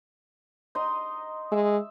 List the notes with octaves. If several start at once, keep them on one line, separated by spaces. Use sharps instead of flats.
D#4 D#5 C6
G#3 E5